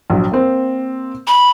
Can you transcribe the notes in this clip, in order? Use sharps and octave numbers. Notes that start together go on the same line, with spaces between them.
A#1 F#3
A#3 C4 C5
B5